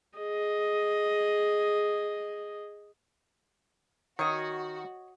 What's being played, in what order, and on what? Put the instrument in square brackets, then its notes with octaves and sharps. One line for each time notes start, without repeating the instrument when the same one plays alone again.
[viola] G#4 D#5
[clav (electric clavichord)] D#3 [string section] F#4 [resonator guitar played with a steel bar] C#5 D#5